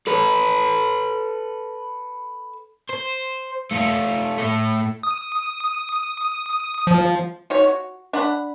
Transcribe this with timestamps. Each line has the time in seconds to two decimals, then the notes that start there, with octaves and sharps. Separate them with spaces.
0.07 A4 B4
2.89 C5
3.71 A3 F4
4.39 A2 A3
5.03 D#6
6.87 F3
7.50 D#4 F#4 C#5
7.64 F#4
8.13 D4 F#5 B5